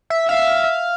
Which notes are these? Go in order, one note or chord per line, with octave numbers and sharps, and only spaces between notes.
E5
E5 F5